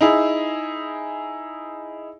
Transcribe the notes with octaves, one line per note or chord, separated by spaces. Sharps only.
D#4 E4 G#4